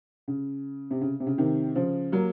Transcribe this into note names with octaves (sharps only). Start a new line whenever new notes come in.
C#3
C3
C#3
C3
C#3
C3 D#3
C#3 F3
F#3 A#3